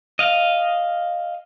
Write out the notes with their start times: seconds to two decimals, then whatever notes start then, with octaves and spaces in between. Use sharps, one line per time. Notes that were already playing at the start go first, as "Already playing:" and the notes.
0.19 D#5 F5